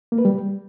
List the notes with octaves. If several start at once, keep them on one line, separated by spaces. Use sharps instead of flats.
A#3
B4
G3